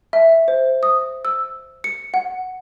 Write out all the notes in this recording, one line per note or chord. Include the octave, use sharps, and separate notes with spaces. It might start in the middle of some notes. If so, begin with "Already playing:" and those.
E5
C5
D#6
E6
C#7
F#5